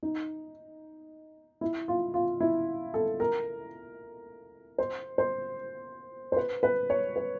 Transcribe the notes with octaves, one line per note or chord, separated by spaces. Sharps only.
D#4
E4
F4
F4
E4
A4
A#4
C5
C5
C5
B4
B4
C#5
B4